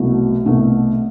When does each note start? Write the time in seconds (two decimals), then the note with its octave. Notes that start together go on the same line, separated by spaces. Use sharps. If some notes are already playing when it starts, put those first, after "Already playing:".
Already playing: C2 B2 F#3 A3
0.46 C2 B2 A3